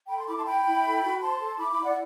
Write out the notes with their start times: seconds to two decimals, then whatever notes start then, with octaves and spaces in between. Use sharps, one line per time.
0.08 A4 G5 B5
0.17 A5 C6
0.27 E4 B5 D6
0.37 A5 C6
0.45 E4 G5 B5
0.65 E4
0.83 A4
1.02 F#4
1.21 C5 A5 C6
1.40 A4
1.59 E4 B5 D6
1.71 B5 D6
1.77 E4
1.83 D5 F#5